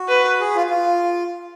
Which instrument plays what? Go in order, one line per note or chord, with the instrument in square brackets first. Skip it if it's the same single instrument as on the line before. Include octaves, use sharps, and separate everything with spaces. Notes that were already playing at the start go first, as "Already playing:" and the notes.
Already playing: [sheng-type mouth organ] F#4
[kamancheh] B4
[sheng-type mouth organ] G#4
F4
F4